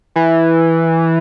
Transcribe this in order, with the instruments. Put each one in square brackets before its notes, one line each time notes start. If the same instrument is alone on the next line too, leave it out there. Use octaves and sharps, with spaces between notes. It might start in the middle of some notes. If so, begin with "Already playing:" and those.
[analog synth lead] E3